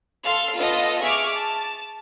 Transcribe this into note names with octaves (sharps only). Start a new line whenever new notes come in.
A4 F5 C6
B3 F4 A4 D#5
G#4 E5 C#6 D6 F6
A5